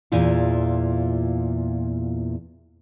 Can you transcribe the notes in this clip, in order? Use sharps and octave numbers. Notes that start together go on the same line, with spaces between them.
E2 A#2 E4 F4